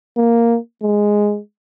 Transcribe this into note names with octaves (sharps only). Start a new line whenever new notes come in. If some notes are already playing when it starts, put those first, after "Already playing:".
A#3
G#3